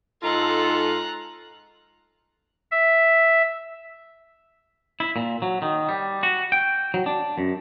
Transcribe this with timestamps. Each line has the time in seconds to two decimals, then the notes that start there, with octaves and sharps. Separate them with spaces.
0.23 G#2 D#4 F4 A4 A#5 F#6
2.71 E5
5.00 E4
5.16 A#2
5.42 F#3
5.62 D#3
5.89 G3
6.23 F#4
6.52 G5
6.94 F#3
7.06 D4
7.38 F#2